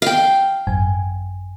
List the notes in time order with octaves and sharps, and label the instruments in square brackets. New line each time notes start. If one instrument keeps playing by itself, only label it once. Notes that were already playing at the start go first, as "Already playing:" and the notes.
[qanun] F5 G5
[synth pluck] G#1 F#2 G#5